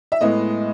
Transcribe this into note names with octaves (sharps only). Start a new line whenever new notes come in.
E5
A2 G#3 B3 D#5